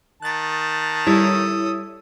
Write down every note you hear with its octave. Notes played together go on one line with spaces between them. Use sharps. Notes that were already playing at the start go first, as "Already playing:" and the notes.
D#3 A5 F#6 A6
G3 E4 A4 C#5 D#6